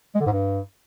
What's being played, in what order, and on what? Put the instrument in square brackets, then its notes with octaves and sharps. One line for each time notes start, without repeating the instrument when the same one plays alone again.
[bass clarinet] G#3
D3
G#2
G2